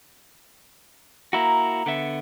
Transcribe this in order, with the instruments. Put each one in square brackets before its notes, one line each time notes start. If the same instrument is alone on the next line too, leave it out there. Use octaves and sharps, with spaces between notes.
[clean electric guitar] A#3 E4 F#4 [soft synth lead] A#5
[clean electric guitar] D3 B3 E5